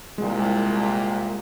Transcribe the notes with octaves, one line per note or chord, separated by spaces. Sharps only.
C2 A#2 G#3